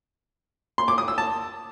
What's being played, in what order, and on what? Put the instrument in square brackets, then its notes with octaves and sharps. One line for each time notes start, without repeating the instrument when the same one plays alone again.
[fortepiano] C6
D6
D#6
E6
A5